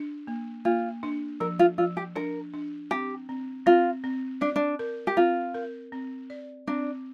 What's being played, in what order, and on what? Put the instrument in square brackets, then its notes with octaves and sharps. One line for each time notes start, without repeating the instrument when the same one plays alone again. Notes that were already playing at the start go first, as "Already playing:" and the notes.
Already playing: [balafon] D4
A#3
[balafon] A#3 [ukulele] F4
[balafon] D4
[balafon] F3 [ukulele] A#4
[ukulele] F4
[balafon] F3 [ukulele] F4
[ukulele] G4
[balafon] D4 [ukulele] A#4
[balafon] D4
[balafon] C4 [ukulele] G4
[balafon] C4
[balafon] C4 [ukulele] F4
[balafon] C4
[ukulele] D4 [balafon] D5
[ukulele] D4
[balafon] A#4
[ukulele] G4
[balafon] C4 [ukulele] F4
[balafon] A#4
C4
D5
[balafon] C4 [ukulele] D4